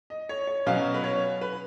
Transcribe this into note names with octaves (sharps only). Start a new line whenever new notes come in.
D#5
C#5
C#5
B2 F#3 C#4 F5
B4
C#5
B4